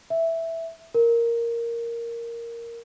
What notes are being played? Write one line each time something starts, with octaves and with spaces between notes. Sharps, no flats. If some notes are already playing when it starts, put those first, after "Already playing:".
E5
A#4